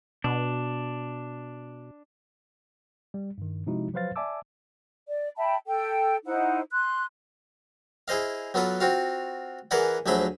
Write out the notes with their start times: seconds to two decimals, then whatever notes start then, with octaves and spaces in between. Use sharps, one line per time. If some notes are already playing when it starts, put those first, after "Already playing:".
0.24 B2 D4
3.14 G3
3.38 G2 D#3
3.66 C3 F3 G#3 D#4 E4 F#4
3.93 F3 F#3 B4 C5 F5 A6
4.16 D5 E5 G#5 A5 D6 E6
5.07 D5
5.37 E5 G5 A5 B5
5.66 A4 G5
6.25 D#4 E4 C5 F#5
6.71 C6 F#6
8.08 E4 G#4 C5 D#5 F5
8.54 F#3 B3 F4 A4 B4
8.80 C4 F4 F#4 F5
9.71 E3 G#4 A#4 B4 D5 F#5
10.06 D2 F3 F#3 G#4 E5 B5